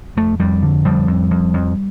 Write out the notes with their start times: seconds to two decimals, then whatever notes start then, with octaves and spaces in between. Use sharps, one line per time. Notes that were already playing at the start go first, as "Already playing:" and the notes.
0.17 F2 A3
0.39 F2 G3
0.63 D3
0.85 F2 G3
1.08 F2
1.31 F2
1.54 F2